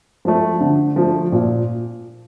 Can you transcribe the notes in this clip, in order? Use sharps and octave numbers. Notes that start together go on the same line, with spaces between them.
F3 A3
D3
F3
A3
A#2